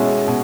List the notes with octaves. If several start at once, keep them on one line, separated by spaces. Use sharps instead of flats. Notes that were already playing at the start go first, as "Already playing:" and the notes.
Already playing: B2 G#3 C#4 E4
B2